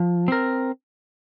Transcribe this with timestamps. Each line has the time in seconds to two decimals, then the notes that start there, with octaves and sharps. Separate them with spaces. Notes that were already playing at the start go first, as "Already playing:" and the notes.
Already playing: F3
0.28 C4 A#4